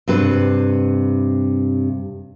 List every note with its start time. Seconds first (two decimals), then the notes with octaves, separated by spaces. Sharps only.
0.08 G2 C3 B4